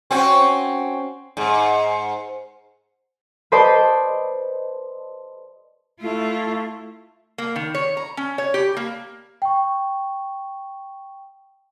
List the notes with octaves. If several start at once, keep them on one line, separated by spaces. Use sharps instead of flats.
C4 C#4 F#4
G#2
B4 C5 D5 D#5 A5 C6
A3 E4 F4
A#3
D#3
C#5
A#5
C#4
C#5
G4
A#3
G5 C#6